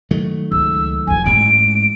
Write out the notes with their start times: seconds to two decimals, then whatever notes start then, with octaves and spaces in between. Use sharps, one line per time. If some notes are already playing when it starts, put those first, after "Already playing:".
0.11 D#3 F#3 A3
0.52 C#2 E6
1.07 F1 F3 G#5
1.26 A1 G#2 G#3 D7